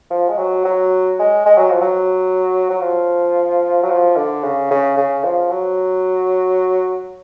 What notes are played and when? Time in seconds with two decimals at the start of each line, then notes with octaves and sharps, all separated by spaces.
0.10 F3
0.29 G#3
0.38 F#3
0.65 F#3
1.19 G#3
1.46 G#3
1.57 F#3
1.70 F3
1.81 F#3
2.70 F#3
2.81 F3
3.83 F#3
3.90 F3
4.16 D3
4.44 C#3
4.71 C#3
4.98 C#3
5.24 F3
5.51 F#3